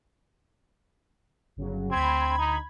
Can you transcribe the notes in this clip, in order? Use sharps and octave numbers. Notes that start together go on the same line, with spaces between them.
G1 C#3 F#3
D2 C4 B5 G#6
D#4